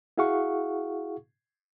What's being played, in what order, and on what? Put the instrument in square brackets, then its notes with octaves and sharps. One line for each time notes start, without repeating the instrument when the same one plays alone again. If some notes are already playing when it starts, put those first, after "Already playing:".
[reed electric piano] E4 F#4 G#4 F5 F#5 C#6